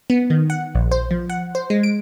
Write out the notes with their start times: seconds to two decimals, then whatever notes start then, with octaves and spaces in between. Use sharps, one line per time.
0.10 B3
0.30 D#3
0.50 F#5
0.75 A#1
0.91 C5
1.11 F3
1.30 F#5
1.55 C5
1.70 G#3
1.83 D7